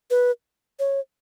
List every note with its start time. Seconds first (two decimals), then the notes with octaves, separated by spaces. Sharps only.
0.11 B4
0.79 C#5